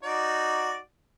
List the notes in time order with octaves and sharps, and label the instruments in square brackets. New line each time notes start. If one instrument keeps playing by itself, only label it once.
[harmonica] D#4 F#4 D5